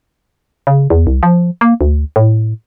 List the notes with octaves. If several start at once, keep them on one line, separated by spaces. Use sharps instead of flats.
C#3
E2
C2
F3
A#3
D2
A2